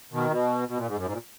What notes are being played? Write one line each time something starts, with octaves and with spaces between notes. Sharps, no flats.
B2 D#3
B2
B2
A#2
G#2
F#2
G#2
A#2